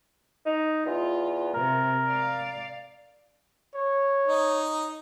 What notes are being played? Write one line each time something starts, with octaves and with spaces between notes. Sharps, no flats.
D#4
E2 F4
C3 A#4
D5 F5
C#5
D#4